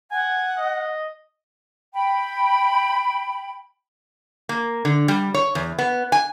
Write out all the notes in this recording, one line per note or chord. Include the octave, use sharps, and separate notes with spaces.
F#5 G#5
D#5
G5 B5
A#3
D3
G3
C#5
E2
B3
G#5